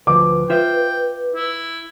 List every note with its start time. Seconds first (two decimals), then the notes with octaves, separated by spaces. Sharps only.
0.07 D2 F3 B4 D6
0.50 F4 C5 E5 G5
1.35 E4